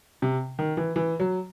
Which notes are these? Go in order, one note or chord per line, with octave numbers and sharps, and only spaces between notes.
C3
D#3
E3
E3
F#3